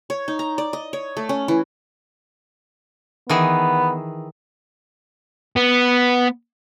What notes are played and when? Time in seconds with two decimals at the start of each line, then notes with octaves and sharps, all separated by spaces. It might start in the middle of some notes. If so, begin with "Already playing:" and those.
0.10 C#5
0.28 D#4
0.39 A#5
0.58 D5
0.73 D#5
0.93 C#5
1.17 A3
1.29 C#4
1.48 E3
3.29 D#3 E3 B3 G#4
5.56 B3